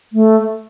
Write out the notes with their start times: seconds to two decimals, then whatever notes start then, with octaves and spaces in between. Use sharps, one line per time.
0.13 A3